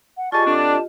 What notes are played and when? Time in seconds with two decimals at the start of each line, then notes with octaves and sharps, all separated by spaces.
0.17 F#5
0.32 F4 G4 G#4 D5 D#5 A5 C#6
0.46 D3 C4 D4
0.57 A5